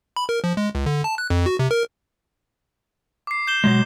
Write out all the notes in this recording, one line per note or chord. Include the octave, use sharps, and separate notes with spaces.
B5
A#4
F3
G#3
C#2
D3
A5
F#6
F2
F#4
C3
A#4
D6 C7
G6 E7 G7
B2 F#3 G#3